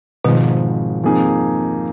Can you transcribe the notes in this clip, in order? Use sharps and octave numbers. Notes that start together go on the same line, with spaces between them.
G#1 G#2 B2 D#3 F3 G#3
F2 F3 A#3 D#4 G#4